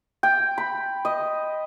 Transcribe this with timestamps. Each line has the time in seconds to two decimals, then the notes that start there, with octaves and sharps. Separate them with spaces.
0.23 G5
0.58 B5
1.05 D#5